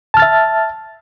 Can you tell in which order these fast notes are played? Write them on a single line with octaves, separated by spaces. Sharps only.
A5 F6 A6 E5